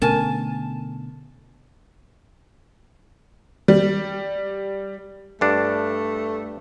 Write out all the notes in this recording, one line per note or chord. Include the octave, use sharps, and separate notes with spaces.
B2 D3 A3 C#4 A#4 G#5 A5
G3
G2 A3 D4